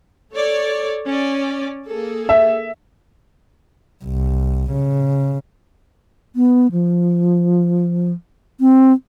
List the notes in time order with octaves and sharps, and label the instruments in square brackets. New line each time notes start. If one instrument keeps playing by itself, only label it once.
[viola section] A4 C#5 D5
C#4 D5
A#3 G#4 A4
[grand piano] E5
[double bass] C2
C#3
[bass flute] B3
F3
C4